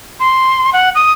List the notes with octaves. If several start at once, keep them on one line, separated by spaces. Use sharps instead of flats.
C6
F#5
D#6